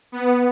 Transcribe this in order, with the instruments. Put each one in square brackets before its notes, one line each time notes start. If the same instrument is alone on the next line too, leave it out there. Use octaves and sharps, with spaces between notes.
[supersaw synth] B3